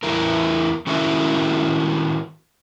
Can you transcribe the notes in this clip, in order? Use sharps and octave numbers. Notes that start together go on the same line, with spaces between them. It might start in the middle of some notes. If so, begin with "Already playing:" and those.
E2 E4 A#4
D#3 C#4 E4 F#4 A#4 E5